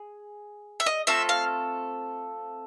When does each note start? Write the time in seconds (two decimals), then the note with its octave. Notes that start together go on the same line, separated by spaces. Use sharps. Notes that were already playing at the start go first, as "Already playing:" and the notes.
Already playing: G#4
0.80 E5
0.86 D#5
1.07 A3 C4 F4 A4 E5
1.29 F5